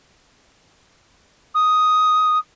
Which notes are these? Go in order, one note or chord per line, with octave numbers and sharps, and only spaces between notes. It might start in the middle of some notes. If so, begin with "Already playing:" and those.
D#6